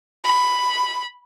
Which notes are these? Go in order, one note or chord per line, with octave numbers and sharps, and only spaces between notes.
B5